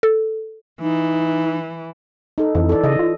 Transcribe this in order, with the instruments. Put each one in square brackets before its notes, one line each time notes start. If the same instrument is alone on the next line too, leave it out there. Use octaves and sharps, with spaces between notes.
[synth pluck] A4
[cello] E3 [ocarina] D#4
[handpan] D#4 A4
[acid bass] F2 [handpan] E3
[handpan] A4 D5
[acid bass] C#3 [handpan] D#5
[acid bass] F4